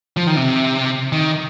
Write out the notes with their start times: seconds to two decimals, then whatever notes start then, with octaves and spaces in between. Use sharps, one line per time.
0.17 F3
0.27 D#3
0.37 C3
1.12 D#3